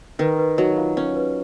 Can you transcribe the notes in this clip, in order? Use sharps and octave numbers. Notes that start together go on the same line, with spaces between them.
D#3 B4
B4
F#3 D#4 D#5
F4 F5
C#4 C#5
B4